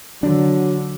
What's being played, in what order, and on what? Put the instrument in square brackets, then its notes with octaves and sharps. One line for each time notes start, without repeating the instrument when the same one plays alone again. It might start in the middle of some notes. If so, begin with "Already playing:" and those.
[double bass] D3 [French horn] F#3 [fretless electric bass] D4